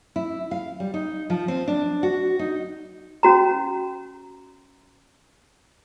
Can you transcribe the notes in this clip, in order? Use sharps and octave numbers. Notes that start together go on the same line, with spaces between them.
E4
F5
G3
D#4
F3
C4
D4
F#4
D#4
C#4 F#4 A#5